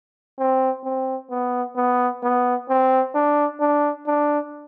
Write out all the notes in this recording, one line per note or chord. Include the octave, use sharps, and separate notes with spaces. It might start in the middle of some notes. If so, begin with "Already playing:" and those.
C4
C4
B3
B3
B3
C4
D4
D4
D4